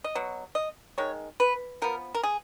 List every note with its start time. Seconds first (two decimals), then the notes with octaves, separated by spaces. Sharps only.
0.04 D#5
0.15 B2 F#3
0.55 D#5
0.98 D#3 G#3 C#5
1.40 B4
1.82 F3 B3 A#4
2.14 A#4
2.23 G#4